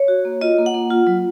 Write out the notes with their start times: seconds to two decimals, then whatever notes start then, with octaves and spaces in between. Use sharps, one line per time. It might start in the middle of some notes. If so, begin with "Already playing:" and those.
Already playing: C#5
0.08 F#4
0.25 A#3
0.41 F4 D#5
0.58 A#3
0.66 F#5
0.74 A#3
0.90 F4
1.07 F#3